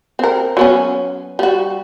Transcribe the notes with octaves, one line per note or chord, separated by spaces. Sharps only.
C4 A#4
F#3 B3 C#4
G3 F#4